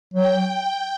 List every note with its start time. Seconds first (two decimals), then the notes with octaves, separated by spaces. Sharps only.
0.14 F#3 G5
0.49 G5